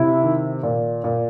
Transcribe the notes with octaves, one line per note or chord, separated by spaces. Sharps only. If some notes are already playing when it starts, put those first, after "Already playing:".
Already playing: C3 E4
D#3
A#2
A#2